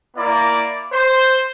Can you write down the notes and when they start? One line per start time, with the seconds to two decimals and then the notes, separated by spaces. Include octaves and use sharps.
0.17 A#3 E4 D5
0.92 C5